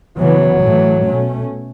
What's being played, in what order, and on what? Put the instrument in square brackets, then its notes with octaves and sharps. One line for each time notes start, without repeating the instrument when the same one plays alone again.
[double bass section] C#3 E3 B3 [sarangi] F#3
[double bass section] A2 E3 A3
B2 A3 C#4